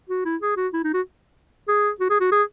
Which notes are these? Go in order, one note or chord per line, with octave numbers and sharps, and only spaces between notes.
F#4
E4
G#4
F#4
E4
D#4
F#4
G#4
F#4
G#4
F#4
G#4